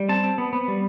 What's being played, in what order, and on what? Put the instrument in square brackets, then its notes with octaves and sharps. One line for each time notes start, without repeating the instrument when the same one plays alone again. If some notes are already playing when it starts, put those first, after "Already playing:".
Already playing: [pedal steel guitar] G3
C4 A5
C4
B3
B3
G3